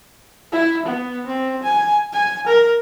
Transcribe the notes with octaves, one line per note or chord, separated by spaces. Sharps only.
E4
B3
C4
G#5
G#5
A#4